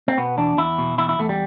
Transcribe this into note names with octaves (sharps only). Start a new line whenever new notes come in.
C4
B2 B3
E2 D4
E2 E4
B2
E2 E4
E4
E2 A3
G3